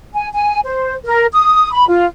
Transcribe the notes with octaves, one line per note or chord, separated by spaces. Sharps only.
G#5
G#5
C5
A#4
D#6
B5
F4